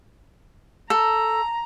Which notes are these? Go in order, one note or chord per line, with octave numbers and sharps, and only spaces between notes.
A4 A#5